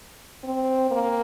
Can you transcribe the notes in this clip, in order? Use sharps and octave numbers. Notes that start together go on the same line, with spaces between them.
C4
A#3